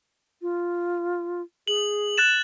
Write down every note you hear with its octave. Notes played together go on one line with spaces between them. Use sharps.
F4
G#4 F#7
F#6 A6 E7